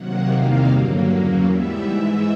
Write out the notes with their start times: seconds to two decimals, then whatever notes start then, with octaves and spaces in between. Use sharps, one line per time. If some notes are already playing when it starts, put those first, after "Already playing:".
Already playing: C3 D#3 F#3 A#3 F#5
0.29 E2 C3 D#3 G3 A#3 F5
0.68 G2 D3 F#3 A#3
1.06 E2 C#3 F#3 A#3
1.44 G#2 E3 G3 B3 E5
1.83 G#2 E3 G#3 E5